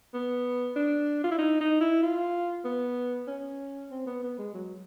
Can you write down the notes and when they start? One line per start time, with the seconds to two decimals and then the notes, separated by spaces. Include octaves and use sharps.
0.14 B3
0.76 D4
1.24 F4
1.31 E4
1.39 D#4
1.61 D#4
1.81 E4
2.03 F4
2.65 B3
3.28 C#4
3.91 C4
4.07 B3
4.23 B3
4.39 G#3
4.54 F#3